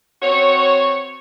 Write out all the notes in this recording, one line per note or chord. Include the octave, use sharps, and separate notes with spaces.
C4 F#4 C#5